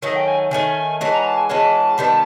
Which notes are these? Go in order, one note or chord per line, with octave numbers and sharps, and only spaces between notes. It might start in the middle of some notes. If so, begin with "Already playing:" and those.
D#3 F#3 A3 C#4 D#5
G5
G#5
D#3 F#3 A3 C#4 G#5
E3 G#3 C#4 F#4 A5
A#5
A5
G#5
E3 G#3 C#4 F#4 A5
C3 D#3 G3 B3